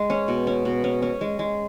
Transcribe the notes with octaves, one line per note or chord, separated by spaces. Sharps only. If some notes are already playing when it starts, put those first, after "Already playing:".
Already playing: G#3
C#4
B2
C#4
B2
C#4
C#4
G#3
G#3